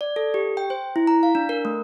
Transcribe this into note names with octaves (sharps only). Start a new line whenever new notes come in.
D5
A4
G4
G5
C5
E4
A#5
F5
D4
A#4
A3